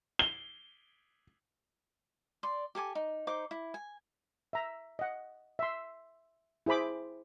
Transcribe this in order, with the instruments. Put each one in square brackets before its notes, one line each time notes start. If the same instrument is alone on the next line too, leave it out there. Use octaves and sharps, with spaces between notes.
[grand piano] G7
[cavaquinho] D5 C6
G4 A4 G#5 D6
D#4
D#4 C5 D6
E4
G#5
[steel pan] E5 A#5
D#5 F#5
E5 C6
E4 G#4 C5 B5 D6